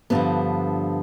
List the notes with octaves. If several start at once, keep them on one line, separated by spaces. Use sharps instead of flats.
G2 D3 F3 B3